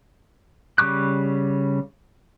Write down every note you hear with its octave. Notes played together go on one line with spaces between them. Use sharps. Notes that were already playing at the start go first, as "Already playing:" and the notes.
C#3 G3 C#6 D6 F#6